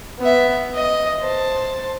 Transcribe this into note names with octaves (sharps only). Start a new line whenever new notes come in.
B3 E5
D#5
C5 A5